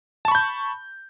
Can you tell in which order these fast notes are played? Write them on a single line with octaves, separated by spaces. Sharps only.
A5 C#6 B5 G6